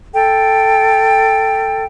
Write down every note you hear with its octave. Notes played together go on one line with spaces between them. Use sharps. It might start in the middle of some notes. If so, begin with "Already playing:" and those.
A4 G5